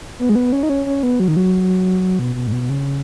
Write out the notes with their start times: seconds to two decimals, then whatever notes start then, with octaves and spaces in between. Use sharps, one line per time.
0.19 B3
0.29 G#3
0.35 B3
0.52 C#4
0.63 D#4
0.69 C#4
0.86 C#4
1.03 B3
1.20 F#3
1.28 D#3
1.36 F#3
2.19 B2
2.35 B2
2.47 G#2
2.52 B2
2.70 C#3